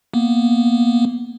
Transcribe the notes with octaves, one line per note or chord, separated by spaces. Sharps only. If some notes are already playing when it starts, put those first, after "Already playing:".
A#3 B3